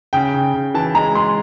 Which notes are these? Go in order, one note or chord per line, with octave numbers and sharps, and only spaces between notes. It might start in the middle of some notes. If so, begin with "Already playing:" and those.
C#3 G5
C#3
C#3
E3 A5
G#3 A#5
G#3 C6